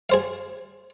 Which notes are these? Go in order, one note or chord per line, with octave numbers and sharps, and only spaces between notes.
G#4 C5 F5